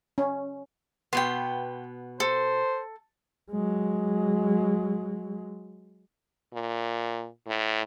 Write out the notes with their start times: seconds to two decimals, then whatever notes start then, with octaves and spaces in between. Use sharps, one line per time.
0.18 C#4
1.13 B2 B3 G5 C6
2.20 A4 C5
3.52 F#3 G#3
6.54 A#2
7.47 A2